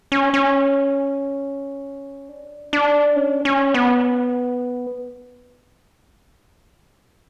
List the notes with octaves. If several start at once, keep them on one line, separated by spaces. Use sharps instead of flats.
C#4
C#4
D4
D4
C#4
C#4
B3